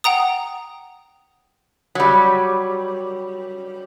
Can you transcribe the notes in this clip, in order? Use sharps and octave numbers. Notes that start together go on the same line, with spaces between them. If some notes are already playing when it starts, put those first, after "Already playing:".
F#5 G5 A#5 D#6
F#3 G3